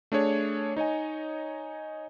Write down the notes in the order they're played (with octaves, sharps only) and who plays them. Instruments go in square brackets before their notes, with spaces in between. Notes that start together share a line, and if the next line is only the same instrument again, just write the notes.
[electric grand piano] A3 D4 G#4 C#5
D#4 C#5 D#5 G#5